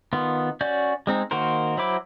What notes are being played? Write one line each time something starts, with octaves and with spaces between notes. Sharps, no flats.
D#3 B3 F4
C#4 F#4 D5 G6
G#3 C4 D#4
D#3 A#3 F#4 A#4 C5
F#3 E4 C5 B5 D6